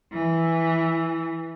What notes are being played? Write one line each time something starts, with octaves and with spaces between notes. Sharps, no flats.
E3